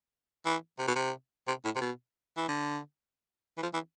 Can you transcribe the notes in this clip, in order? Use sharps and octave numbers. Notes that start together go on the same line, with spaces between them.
E3
C3
B2
C3
C3
A2
C3
B2
E3
D3
E3
F3
E3